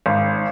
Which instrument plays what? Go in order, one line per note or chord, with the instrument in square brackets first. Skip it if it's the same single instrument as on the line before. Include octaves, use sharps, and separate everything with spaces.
[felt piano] G#1